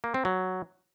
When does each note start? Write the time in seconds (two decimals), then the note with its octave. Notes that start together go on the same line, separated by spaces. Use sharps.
0.04 A#3
0.14 C4
0.25 F#3